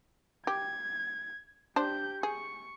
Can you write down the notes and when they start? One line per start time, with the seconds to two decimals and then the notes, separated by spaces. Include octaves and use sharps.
0.47 G4 G#6
1.76 D4 G4 C5 G6
2.23 G#4 C#6